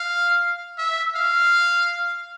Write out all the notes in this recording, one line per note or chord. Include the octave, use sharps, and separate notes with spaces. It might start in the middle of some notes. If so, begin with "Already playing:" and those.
Already playing: F5
E5
F5